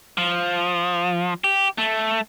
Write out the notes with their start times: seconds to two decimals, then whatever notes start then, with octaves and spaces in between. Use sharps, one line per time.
0.18 F3
1.44 G4
1.78 A3